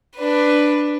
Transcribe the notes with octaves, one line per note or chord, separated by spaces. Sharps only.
D4 B4